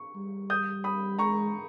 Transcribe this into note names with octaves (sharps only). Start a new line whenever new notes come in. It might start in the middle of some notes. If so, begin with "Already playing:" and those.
Already playing: C#6
G3
D#6 G6
B5 D#6
G#3 A#5 C#6